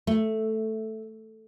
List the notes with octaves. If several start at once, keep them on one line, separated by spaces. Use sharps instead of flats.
A3